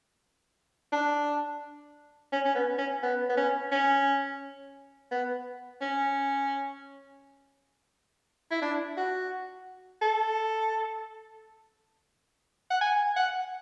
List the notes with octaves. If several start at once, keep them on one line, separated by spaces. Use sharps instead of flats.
D4
C#4
C#4
B3
C#4
B3
B3
C#4
C#4
B3
C#4
E4
D4
F#4
A4
F#5
G#5
F#5